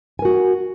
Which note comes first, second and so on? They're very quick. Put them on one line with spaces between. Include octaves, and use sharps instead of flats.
G#5 A#4 F#4